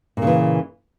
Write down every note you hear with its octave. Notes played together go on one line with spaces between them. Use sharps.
A#2 C#3 E3